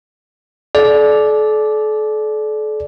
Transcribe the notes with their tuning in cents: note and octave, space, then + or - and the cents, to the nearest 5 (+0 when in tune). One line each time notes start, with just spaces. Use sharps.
A4 -40 D5 +0